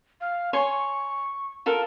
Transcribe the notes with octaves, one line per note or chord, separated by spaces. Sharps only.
F5
C#5 G#5 C6 C#6
F4 A4 A#4